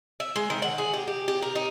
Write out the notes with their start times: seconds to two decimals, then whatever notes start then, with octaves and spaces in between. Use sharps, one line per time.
0.20 E5
0.36 G#3
0.50 D#3
0.62 F#5
0.78 G#4
0.94 G4
1.08 G4
1.28 G4
1.42 A#4
1.55 D#4